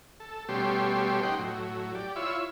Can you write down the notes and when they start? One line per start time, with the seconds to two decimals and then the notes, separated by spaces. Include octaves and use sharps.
0.20 A4
0.49 B2 G3 A3 C#4 G4 C6
1.23 D#4 G4 F#5 G5 C6
1.39 A2 F#3
1.95 G4 D5
2.16 E4 F4 C#5 E5 B5